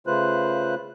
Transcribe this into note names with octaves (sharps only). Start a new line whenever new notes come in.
C#3 A3 F4 B4 C5 F#6